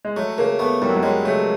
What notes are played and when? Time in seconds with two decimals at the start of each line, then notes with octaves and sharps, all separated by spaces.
0.05 G#3
0.16 F#3 A3
0.38 C#3 A#3
0.59 A3 B3
0.82 F#2 G3
0.89 F#3
0.96 G3
1.03 F#3 G#3
1.25 C#3 A3